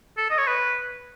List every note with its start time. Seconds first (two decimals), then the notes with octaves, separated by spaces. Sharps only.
0.18 A4
0.30 D#5
0.39 C#5
0.47 B4